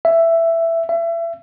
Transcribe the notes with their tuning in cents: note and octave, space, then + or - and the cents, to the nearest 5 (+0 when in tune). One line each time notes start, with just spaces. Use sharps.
E5 +10
E5 +30